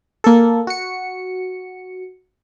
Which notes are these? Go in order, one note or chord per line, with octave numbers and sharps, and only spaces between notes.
A#3 A4
F#4 C#7